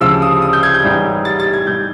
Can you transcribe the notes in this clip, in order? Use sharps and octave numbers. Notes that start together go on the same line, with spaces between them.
D2 C#3 F3 E6
D#6
D#6
G6
G#6
G6
A1 G#2 E3 G3
A6
A6
G#6
D#3 G3 G6